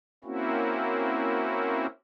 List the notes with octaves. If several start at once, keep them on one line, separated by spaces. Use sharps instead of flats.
A#3 C4 C#4 E4 F#4